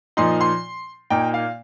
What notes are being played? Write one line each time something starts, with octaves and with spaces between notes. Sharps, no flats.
A#2 F3 D#4 C6
C6
A#2 A#3 D#4 G5
F5